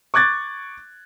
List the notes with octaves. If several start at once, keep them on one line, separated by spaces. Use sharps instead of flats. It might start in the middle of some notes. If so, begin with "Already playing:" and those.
C#6 D6 F#6 G#6 A6